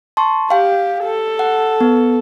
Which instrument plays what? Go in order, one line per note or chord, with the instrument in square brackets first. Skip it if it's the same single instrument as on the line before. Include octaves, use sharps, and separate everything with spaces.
[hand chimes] A5 C6 C#6
[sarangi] G4 [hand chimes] F5 G5
[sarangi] A4
[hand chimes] F#5
B3